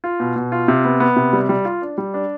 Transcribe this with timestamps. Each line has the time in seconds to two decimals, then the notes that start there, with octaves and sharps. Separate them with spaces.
0.04 F4
0.20 B2
0.36 B2
0.52 F4
0.68 C3
0.84 B3
1.00 B3
1.16 C3
1.33 G3
1.49 G3
1.65 F4
1.82 D4
1.98 G3
2.14 D4